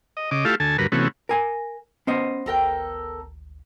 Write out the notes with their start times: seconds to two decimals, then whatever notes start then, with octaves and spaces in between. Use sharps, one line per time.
0.17 D#5
0.31 C#3 D#5 D6
0.45 A3 E4 F4 G4 A4 F5
0.60 D2 A4 G#5 A5
0.78 D2 G2 F#4 A#4 B4
0.92 C3 E3 A3 B3 C#4 F#4
1.29 A#4 G#5
2.07 B3 C#4 C5 D#5
2.46 G#1 D2 A4 A#4 G5